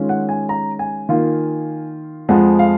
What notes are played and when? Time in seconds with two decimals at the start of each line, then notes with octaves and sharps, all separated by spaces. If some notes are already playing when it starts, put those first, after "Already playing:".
Already playing: D#3 G#3 C#4 F4
0.09 F#5
0.29 G#5
0.49 A#5
0.79 G#5
1.09 D#3 A#3 F4
2.29 F2 F3 G#3 F#5
2.59 F5